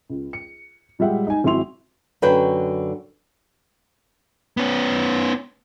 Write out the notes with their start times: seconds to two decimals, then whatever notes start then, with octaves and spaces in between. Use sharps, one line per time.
0.10 C#2
0.33 C#7
0.99 A#2 G3 G#3 E5 F#5 G5
1.27 D#4 G#5
1.44 G#1 F#3 E4 C6 F7
2.22 F#2 D3 F#4 B4 G5
4.57 B3 C#4